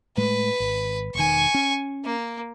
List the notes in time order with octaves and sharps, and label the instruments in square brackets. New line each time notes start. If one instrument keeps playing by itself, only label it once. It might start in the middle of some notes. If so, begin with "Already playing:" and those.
[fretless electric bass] A2 G#3 A3 [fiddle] B4
[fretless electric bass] G#1
[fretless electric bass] E1 D#3 [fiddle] G#5 C#6
[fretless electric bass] C#4
[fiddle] A#3